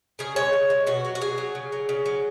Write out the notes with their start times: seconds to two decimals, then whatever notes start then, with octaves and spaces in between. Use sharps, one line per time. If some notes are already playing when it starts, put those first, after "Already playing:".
0.19 C#3 G#4
0.36 G#3 C#5
0.53 C#3
0.70 G#3
0.87 B2 F#4
1.05 F#3
1.15 F#4
1.21 B2 G#4
1.38 F#3
1.55 C#3
1.72 F#3
1.89 C#3
2.06 F#3